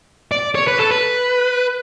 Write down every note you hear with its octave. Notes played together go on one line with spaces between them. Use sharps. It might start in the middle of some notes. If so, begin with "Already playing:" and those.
D5
C#5
B4
A4
B4